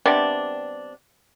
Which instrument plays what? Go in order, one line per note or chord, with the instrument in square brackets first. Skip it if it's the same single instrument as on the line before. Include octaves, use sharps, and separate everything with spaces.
[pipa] C3 G3 B3 D4